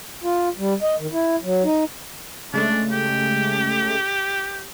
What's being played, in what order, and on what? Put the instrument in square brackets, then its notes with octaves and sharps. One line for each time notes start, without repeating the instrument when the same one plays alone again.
[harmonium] F4
G3
D#5
D#3
E4
F#3
D#4
[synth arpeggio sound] C#3 G#3 A3 [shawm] D4
[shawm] G4